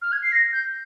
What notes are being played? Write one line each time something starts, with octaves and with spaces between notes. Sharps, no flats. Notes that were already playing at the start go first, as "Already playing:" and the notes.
F6
G#6
C7
A#6
G6